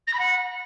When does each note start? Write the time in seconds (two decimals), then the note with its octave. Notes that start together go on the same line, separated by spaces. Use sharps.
0.07 A#6
0.13 B5
0.19 F#5